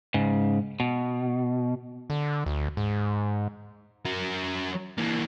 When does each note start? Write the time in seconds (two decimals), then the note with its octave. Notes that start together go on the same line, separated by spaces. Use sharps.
0.14 G#2 C#3
0.80 B2
2.10 D3
2.46 D2
2.77 G#2
4.05 F#3 A#4
4.98 E3 A#3